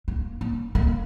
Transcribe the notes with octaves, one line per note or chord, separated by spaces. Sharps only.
A#3
A#3
A#3